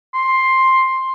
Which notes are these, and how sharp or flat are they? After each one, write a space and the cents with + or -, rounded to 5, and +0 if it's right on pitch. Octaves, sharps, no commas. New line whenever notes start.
C6 +10